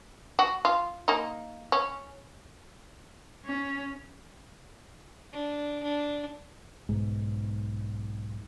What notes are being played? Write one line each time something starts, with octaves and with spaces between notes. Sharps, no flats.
F#4
F4
A#3 D#4
C#4
C#4
D4
D4
B1 G#2